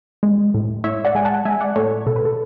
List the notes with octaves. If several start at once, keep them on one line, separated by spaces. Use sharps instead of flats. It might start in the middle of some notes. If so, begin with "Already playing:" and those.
G#3
A2
A2 C#5 E5
D5 F#5
G#3 G#5
F#5 A5
G#3 E5 G#5
D5 F#5
A2 A4 C#5
B2 A4
B4
A4